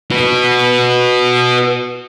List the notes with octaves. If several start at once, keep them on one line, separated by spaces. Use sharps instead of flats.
F#4 B4